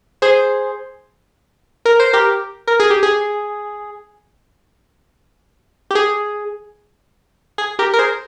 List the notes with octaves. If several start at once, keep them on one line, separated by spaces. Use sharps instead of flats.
G#4 C5
A#4
C5
G4 A#4
A#4
G#4
G4
G#4
G4
G#4
G#4
G4 A#4
A#4
G#4 C5